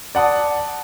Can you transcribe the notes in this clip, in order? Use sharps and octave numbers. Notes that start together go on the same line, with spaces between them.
D5 F#5 A5 D#6